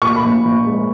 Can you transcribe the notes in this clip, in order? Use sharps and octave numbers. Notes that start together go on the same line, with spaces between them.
A#2 C#6
B5
A#1
A#1
G#3